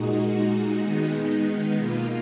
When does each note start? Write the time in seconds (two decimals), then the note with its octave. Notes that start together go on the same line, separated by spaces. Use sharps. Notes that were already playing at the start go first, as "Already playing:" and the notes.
Already playing: A#2 G#3 D#4 F#4
0.81 D#3 G#3 B3 D#4
1.77 B2 A#3 F4